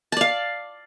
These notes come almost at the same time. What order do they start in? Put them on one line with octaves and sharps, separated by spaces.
A5 D5 F5